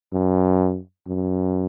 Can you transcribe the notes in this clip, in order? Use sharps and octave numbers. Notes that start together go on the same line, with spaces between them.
F#2
F#2